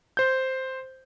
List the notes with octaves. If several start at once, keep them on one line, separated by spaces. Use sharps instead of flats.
C5 G6